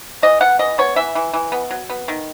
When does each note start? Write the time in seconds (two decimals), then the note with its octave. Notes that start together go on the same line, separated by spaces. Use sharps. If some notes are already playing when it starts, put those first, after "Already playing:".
0.23 E3 D#5
0.41 B3 F#5
0.59 E3 D#5
0.78 B3 C#5
0.96 E3 E5
1.15 E3
1.33 E3
1.52 B3
1.71 F#3
1.89 B3
2.08 D#3